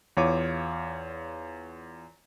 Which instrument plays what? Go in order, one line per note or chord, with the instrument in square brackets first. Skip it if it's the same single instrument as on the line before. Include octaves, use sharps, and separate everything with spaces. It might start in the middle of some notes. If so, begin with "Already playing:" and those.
[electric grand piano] E2 F4 C#5 F5 D6 D#7